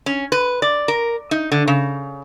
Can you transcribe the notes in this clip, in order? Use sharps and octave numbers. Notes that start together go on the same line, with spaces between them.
C#4
B4
D5
A#4
D#4
D3
C#3